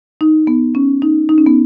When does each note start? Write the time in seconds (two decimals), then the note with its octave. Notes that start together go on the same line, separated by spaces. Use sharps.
0.21 D#4
0.47 B3
0.75 C#4
1.02 D#4
1.29 D#4
1.38 C#4
1.46 B3